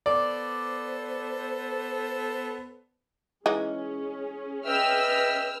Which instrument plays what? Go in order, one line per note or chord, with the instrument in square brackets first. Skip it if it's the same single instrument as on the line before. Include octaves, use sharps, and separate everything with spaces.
[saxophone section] B3 A4 C5 [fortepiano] D5
[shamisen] E3 G#3 D#4 [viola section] C#4 G#4
[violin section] B4 E6 F6 [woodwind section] D#5 E5 G5